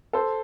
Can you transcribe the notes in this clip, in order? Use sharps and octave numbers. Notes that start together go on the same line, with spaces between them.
A4 C5